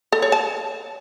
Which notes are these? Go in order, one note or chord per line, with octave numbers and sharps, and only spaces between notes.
A4
C#5
A5